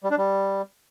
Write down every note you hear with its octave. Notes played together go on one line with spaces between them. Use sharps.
G3
D4
G3